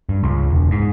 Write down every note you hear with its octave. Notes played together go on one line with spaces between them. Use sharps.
G2
C#2
E1
G#2